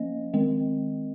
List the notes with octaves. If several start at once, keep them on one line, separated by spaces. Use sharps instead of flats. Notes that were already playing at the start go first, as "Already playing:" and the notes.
Already playing: F3 A#3 C#4 D#5
D#3 G#3 C4